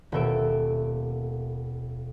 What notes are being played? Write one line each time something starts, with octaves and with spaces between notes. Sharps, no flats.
D#1 B2 A4 E5 D7